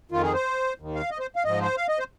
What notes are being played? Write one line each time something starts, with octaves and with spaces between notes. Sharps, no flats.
F2 D#3 F4
G#4
C5
D#2 D#3
F5
D#5
C5
F5
G#2 F3 D#5
C5
F5
D#5
C5